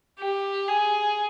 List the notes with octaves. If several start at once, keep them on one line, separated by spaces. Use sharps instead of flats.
G4
G#4